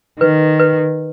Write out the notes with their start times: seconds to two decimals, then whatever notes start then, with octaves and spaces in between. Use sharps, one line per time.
0.20 D#3 B4
0.60 B4